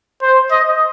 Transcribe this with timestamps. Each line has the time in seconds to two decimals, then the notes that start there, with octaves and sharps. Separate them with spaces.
0.22 C5
0.51 D#5